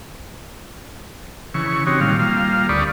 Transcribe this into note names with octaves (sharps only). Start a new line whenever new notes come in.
C#3 E3 C#6
C4 D#4 F#4 G4 C#5
A#2 D#3 G3 F5
G3 A#3 F4 F5
D2 G4 D5 B5 C#6 D#6